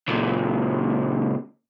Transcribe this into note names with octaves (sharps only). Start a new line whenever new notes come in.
C#2 A#2